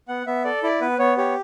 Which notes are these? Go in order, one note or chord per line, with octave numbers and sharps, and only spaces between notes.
B3 F#5
B3 E5
A4 D5
E4 D5
B3 B4
B3 C#5
G4 C#5